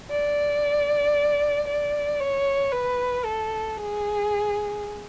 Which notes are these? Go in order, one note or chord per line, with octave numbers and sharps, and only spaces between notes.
D5
D5
C#5
B4
A4
G#4